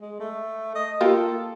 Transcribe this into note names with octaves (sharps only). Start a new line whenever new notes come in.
G#3
A3
D#5
A#3 F4 G4 A4